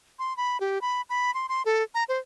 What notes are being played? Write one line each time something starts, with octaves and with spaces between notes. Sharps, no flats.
C6
B5
G4
B5
B5
C6
C6
A4
A#5
C5